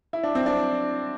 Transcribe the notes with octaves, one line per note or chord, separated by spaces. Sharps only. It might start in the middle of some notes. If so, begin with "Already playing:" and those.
E4
D4
C4
D4